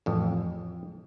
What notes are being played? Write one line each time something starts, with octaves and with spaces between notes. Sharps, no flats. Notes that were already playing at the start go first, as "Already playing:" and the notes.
A1 F2